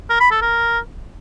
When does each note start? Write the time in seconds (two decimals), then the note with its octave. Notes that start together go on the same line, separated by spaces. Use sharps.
0.10 A#4
0.20 B5
0.31 A4
0.42 A#4